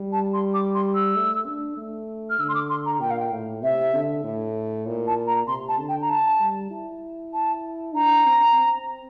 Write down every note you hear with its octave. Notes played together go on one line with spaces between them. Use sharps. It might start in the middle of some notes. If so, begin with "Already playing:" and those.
Already playing: G3
A5
C6
D6
C6
E6
A3
D4
A3
F6
D3 E6
C6
D6
C6
A#5
A#2 G5
F5
G5
A2
C3 E5
D3
A2
A#2
A5
A#5
C3 C6
A5
D3
G5
A#5
A5
G3
E4
A5
D4 A#5
C4
C4